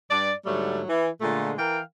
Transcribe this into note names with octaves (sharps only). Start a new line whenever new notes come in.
G2 D5
G#2 D3 F#3 G3 A3
E3
A#2 D3 G#3 A3 F4
E3 A#4 F5 G5